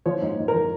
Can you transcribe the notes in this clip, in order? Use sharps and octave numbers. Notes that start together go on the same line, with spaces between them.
F3 C#5
G#2
G#2
A#4
F3